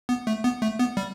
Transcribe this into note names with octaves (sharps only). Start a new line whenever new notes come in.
B3
A3
B3
A3
B3
G3